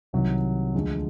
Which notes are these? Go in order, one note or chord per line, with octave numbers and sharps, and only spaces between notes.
C2 C3 D#3 F#3
D2 D3 F3 G#3